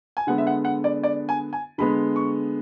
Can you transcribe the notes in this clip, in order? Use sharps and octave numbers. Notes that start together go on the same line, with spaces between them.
G#5
D3 G#3 B3 F#5
E5
F#5
F#5
D5
D5
G#5
G#5
D3 G#3 B3 B5
C#6